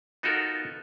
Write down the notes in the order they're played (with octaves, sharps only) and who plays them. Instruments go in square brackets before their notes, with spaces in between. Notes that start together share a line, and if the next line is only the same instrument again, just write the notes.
[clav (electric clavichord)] B3 D#4 F4 F#4 A4 A#4